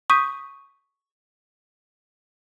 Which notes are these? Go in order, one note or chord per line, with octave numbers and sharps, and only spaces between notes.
C#6 D#6 G6 B6 D#7